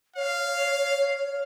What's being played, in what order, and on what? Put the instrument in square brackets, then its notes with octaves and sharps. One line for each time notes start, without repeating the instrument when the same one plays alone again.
[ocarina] C#5 [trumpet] F5